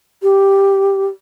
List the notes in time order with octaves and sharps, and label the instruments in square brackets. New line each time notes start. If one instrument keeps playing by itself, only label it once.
[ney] G4